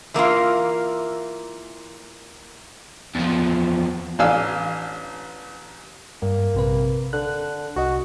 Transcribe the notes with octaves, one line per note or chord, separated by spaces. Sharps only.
E3 A#3 E4 F4
E2 F3
A1 D4 F5 G#5 E6
G2 A#3
A#1 C3 B4
D3 F#6
C2 F#4 D#5